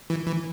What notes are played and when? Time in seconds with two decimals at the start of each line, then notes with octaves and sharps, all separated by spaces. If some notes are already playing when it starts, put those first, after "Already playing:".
0.10 E3
0.27 E3